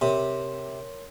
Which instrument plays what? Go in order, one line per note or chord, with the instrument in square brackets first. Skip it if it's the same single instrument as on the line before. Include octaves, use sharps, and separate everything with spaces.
[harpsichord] C3 [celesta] A#4 C#5 C6